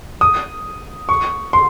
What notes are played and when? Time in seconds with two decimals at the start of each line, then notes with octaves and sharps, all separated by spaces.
0.21 D#6
1.09 C#6
1.53 C6